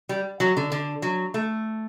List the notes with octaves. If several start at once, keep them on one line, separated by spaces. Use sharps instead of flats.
G3
F#3
D3
D3
F#3
A3